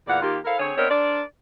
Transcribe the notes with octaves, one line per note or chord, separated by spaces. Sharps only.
E2 A#2 D5 F5 F#5
D#3 A#3 F4 G4
E4 A4 A#4 C5 F5
D3 C4 G#4 C#5
B3 C4 D4 A#4 C#5 D#5
D4 A#4 C5 D5